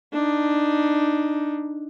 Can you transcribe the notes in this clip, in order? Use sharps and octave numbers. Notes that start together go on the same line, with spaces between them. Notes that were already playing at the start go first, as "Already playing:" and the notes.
D4 D#4